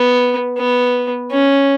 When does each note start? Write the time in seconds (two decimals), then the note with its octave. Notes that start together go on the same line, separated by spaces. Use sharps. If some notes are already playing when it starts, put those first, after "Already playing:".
Already playing: B3
0.58 B3
1.31 C#4